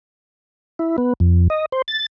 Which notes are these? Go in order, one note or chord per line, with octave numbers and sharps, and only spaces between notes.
E4
B3
F2
D#5
C5
A6